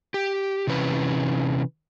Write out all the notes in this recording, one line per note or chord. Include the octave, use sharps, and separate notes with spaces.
G4
C3 E3 C#4 B4